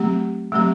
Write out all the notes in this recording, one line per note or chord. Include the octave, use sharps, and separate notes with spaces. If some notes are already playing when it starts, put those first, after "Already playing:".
Already playing: F#3 A3 C4 G4
F#3 A3 C4 G4